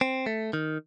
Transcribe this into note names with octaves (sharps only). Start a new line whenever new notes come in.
C4
A3
D#3